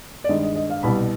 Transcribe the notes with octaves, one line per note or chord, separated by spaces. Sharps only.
D5
G2 D#3 G#3 D#5
D#5
D#5
F5
C2 B2 G3 B5